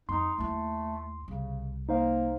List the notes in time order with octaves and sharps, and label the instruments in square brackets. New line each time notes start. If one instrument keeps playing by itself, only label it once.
[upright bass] F2 [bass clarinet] D#4 [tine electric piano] C6
[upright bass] D#2 E4 [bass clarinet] A3
[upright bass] C2 [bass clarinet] C#3
[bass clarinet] A#3 [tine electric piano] D#4 C5 F5